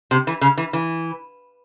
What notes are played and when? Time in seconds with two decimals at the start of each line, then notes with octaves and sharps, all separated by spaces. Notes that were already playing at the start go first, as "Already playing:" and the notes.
0.11 C3
0.27 E3
0.41 C#3
0.58 E3
0.73 E3